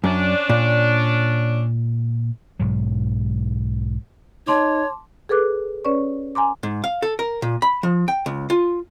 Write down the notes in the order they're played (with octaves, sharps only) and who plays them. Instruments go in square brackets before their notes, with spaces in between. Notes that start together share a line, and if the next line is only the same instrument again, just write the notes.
[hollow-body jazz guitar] F#2 [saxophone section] C#4 D4
[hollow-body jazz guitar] A#2
[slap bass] B1 G#2 F#3
[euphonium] D#4 [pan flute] C#5 [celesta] A5 C6 D6
[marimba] G#4 A4 B4 D6 F#6
C#4 B4 C#5 D5 C#6
G#5 A#5 C6 D6
[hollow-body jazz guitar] G#2
F5
A4
A#4
A#2
B5
F3
G5
C#2
F4